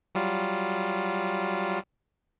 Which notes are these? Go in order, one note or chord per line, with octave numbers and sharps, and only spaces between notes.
F#3 G3 F4